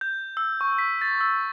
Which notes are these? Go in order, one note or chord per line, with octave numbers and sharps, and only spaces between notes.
G6
E6
C#6
B6
A6
E6